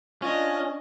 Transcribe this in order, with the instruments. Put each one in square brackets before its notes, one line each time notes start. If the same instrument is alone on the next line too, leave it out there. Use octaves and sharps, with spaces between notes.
[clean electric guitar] C#4 [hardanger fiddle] D4 D#5 [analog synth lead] F4